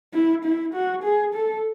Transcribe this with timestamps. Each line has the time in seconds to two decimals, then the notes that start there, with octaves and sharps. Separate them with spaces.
0.14 E4
0.45 E4
0.74 F#4
1.04 G#4
1.34 A4